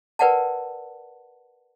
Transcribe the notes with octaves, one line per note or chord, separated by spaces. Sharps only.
A#4 B4 D5 F#5 G5 A5